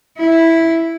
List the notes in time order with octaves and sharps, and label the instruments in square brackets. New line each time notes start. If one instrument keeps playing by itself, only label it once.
[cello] E4